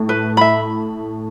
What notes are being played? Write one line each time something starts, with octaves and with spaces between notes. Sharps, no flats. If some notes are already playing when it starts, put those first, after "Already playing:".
Already playing: A2
B4
E5 B5